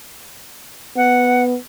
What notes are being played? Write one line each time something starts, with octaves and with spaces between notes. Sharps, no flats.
B3 F#5